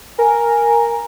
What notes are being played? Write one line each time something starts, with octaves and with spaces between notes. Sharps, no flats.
A#4 G#5